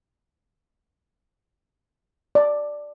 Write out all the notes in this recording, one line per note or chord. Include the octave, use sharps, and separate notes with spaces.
D5